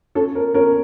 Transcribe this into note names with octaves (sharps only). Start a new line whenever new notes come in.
C#4 A4
A#4
C#4 A#4